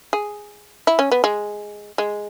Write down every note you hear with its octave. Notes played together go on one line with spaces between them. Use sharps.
G#4
E4
C#4
B3
G#3
G#3